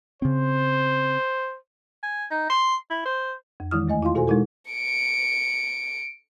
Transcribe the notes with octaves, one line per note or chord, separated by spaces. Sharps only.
C#3 C4 C5
G#5
D#4
C6
E4
C5
F2
D#3 E3 G#3 E4 D#6 F6
E2 A3 D#5 G#5
E4 F4 F5 C6
B2 F#4 A4 C5 G#5
B2 G#3 D#4 E4 A4 A#4
C#7 D7